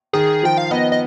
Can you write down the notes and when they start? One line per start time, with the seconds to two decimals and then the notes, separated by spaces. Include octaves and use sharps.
0.13 D#3 G#4
0.43 F3 G5
0.58 F5
0.71 B3 D#5
0.92 D#5